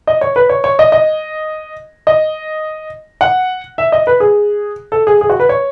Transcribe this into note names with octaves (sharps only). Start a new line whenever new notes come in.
D#5
C#5
B4
C#5
C#5
D#5
D#5
D#5
F#5
E5
D#5
B4
G#4
A4
G#4
G#4
F#4
B4
C#5